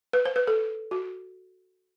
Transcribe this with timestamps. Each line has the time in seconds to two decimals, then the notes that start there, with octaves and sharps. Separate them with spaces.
0.13 B4
0.26 C5
0.36 B4
0.47 A4
0.91 F#4